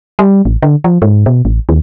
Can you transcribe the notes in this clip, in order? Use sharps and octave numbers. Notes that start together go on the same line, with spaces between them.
G3
A1
D3
F3
G#2
B2
A1
D#2